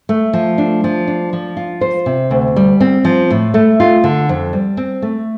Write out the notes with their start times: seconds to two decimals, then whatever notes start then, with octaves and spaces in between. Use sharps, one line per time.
0.09 A3
0.33 F3
0.58 D4
0.84 F3
1.08 D4
1.33 F3
1.57 F4
1.81 C5
2.06 C3
2.31 D2
2.56 G3
2.80 C4
3.05 F3
3.31 A2
3.54 A3
3.80 F4
4.04 D3
4.29 F2
4.53 G3
4.77 C4
5.02 A3